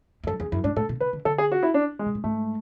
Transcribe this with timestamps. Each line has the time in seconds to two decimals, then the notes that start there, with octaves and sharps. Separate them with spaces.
0.24 E2
0.27 F#2 A4
0.40 E2 G#4
0.52 F#2 E4
0.64 G#2 D4
0.76 A2 A4
0.89 B2
1.00 C#3 B4
1.13 D3
1.25 D3 A4
1.38 G#4
1.52 F#4
1.63 E4
1.74 D4
1.99 G#3
2.06 B2
2.15 A2
2.24 G#2 A3